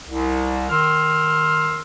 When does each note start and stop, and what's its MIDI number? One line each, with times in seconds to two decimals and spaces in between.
0.07 0.68 36
0.70 1.82 51
0.70 1.82 84
0.70 1.82 88
0.70 1.82 89